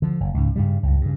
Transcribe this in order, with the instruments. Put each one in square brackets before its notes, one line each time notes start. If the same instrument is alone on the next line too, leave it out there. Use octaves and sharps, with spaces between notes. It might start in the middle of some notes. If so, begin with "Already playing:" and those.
[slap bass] D3 F3
F#1
C#2 G#2
G2 C#3 G3
C#2 G2
G2 C#3